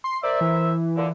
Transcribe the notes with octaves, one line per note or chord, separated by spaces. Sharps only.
C6
A#4 C5 D5 E5
E3
A#2 D3